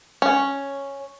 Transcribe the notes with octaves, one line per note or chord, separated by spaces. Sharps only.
C#4